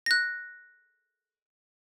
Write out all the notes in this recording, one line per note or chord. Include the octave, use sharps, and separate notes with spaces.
F#6 A#6